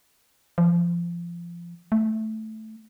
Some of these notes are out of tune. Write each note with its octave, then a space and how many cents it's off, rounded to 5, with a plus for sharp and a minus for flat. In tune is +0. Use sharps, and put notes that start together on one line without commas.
F3 -25
A3 -5